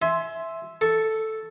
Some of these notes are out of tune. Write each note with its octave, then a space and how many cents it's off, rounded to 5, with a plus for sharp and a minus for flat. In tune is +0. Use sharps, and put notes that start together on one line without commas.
E5 +0 G#5 +25 C6 +0
A4 +0 C#6 +0